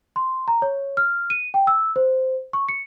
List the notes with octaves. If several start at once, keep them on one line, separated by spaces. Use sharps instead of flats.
C6
A#5
C#5
F6
D#7
G5
E6
C5
C#6
C#7